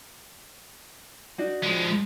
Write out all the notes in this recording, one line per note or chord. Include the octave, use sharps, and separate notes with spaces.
D4 D#4 F#4
F3 G#3